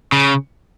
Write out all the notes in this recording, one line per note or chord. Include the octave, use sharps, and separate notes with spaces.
C#3